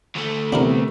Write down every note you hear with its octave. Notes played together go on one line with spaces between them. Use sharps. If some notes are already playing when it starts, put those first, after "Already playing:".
D2 A3
C3 B3 D4 E4 A#4